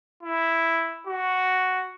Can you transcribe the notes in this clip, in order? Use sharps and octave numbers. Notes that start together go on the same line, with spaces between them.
E4
F#4